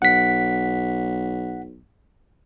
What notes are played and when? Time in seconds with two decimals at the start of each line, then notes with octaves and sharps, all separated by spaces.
0.02 B1 F#5 B6